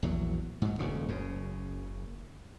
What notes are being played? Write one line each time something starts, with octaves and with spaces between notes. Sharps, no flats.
A#1 E2 F#3
G#2 F#3
D#1 C#2 F#2 C#3
F#1 F#2 C#3